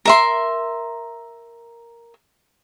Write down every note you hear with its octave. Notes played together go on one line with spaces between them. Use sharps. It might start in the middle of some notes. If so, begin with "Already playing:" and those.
A#4 E5 C6